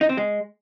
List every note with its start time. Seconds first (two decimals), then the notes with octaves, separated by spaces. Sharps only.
0.01 D#4
0.09 C4
0.17 G#3